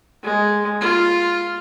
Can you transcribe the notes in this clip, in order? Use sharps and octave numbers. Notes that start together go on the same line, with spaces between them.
G#3
F4